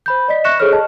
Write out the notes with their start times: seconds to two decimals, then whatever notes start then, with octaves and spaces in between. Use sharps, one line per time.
0.06 C5 B5 G6
0.28 D5 D#5 B6
0.44 E5 C#6 F#6 A#6 C#7 E7
0.59 G#4 A4 C5 C#5 F6
0.72 D#5 A5